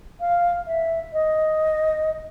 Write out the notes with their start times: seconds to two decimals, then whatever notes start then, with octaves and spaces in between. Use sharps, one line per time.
0.20 F5
0.67 E5
1.13 D#5